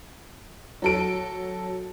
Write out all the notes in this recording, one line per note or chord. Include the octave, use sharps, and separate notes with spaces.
F#3 A4 D7